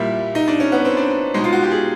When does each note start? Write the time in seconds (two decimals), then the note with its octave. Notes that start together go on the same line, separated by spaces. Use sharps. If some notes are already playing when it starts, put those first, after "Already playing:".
Already playing: A#2 G3 E4
0.35 D#4
0.48 D4
0.60 C#4
0.72 B3
0.85 C4
0.97 D4
1.34 B2 G#3 D#4
1.44 F4
1.53 F#4
1.63 G4
1.72 G#4